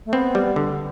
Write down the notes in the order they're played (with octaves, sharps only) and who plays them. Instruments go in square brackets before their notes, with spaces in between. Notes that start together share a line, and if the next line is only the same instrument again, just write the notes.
[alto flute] A3
[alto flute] B3 [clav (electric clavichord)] C4
[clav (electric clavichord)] G3
D3